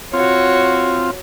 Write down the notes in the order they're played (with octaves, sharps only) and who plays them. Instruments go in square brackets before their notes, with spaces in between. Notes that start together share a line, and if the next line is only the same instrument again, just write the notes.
[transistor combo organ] C4 F4 [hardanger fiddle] F#4 C#5